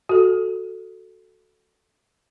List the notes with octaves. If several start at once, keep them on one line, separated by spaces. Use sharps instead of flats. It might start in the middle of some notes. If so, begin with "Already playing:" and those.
F#4 A4